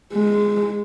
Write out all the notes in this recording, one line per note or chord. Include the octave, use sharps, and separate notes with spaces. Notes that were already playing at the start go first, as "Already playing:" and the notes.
G#3